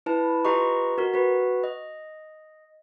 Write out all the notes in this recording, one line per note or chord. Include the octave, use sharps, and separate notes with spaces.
E4 B4 A5
F4 G4 B4 D#5 A#5 C#6
F#4 A#4
F#4 B4
D#5